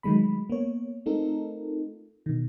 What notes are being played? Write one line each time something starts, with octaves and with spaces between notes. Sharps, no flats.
D#3 F#3 G#3 A3 B5
A#3 B3 C#5
A3 C4 D#4 F4 A4 A#4
B2 D#3